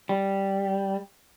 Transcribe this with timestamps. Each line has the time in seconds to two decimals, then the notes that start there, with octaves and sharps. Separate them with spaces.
0.09 G3